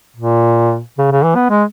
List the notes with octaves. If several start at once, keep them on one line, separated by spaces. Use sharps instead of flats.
A#2
C#3
C#3
E3
B3
G#3